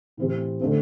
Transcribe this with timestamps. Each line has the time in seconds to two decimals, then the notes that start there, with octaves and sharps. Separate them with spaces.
0.17 A2 E3 C4 G4
0.60 D3 A3 C4